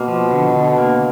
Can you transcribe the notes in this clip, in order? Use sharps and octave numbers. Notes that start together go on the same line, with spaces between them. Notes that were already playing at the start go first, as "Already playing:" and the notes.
Already playing: B2 A#3
F3
D3
D3
A#3